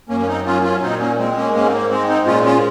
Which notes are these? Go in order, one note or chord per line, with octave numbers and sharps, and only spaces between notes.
F#2 A#3 C#4
C#4
C4 D#4
F#3 C#4 F4
C#4 F4
A#2 C4 D#4
A#3 C#4
G#3 C4
A#3 C#4
G#2 A#3 C#4
C4
A#3
G#3 C4
C4 D#4
A#2 C#4 F4
C#4 F4